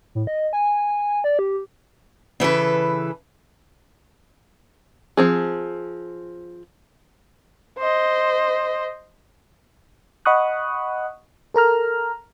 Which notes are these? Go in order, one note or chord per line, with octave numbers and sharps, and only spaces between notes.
A2
D#5
G#5
D5
G4
C#3 E3 A4 B4
F3 C4 G#4
C5 D#5
D#5 F#5 B5 C#6 D#6 F#6
A4 A#4 A#5 F6